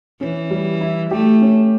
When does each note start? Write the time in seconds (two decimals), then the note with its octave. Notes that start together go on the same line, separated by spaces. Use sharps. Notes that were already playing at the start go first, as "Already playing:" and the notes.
0.21 E3 C#4
0.51 G3
0.81 E4
1.11 A3 G4
1.42 C#4